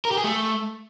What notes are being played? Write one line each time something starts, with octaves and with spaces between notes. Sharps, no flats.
A#4
G4
G#4
A3